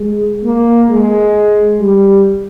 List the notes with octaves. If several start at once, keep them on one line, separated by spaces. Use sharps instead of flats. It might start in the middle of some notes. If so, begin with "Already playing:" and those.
Already playing: G#3
A#3
G#3
G3